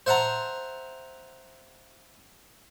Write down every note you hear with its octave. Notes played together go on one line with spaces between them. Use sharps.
C5 E5 F#5 A5 A#5